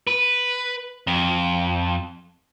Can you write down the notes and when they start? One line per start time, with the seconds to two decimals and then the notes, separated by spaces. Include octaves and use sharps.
0.07 B4
1.07 F2